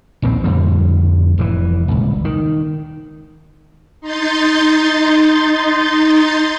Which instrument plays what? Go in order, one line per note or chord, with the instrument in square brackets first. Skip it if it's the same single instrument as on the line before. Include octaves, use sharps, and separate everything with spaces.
[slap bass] A#1 D#2 A2 C4
F2 A2 D3 G3
F1 C#3 E3
D#1 C#2
D#3
[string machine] D#4 C6 G6 A6